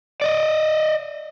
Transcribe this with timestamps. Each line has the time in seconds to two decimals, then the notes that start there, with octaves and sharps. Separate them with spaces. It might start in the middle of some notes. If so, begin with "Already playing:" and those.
0.21 D5 D#5